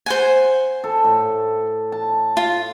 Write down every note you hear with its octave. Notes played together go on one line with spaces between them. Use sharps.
C5 F#5 G#5
A4
A2
A5
F4